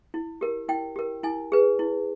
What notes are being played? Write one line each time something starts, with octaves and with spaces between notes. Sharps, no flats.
E4
G4 A#4
E4 G5
G4 A#4
E4 G#5
G#4 B4
E4